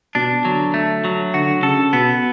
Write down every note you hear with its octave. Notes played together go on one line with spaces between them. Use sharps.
B2 D4
D3 F#3
A3
F#3
D3 F#4
C#3 A4
B2 B3